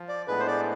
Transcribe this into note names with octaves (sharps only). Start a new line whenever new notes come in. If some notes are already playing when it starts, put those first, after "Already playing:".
Already playing: F3
D5
A2 G#3 B3 D4 G#4 B4
C5
D5